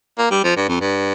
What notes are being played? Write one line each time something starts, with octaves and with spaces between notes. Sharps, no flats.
A#3
G3
F3
G2
F2
G2